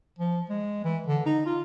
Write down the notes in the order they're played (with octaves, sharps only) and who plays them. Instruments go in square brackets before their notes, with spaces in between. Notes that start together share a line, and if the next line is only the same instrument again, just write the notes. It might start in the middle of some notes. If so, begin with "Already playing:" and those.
[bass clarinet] F3
G#3
E3
D3
D#4
F4